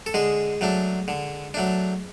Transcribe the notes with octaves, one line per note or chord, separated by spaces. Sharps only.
A4
D3 G#3 G#4
F#3 A3 D4
D3
F#3 A3 D4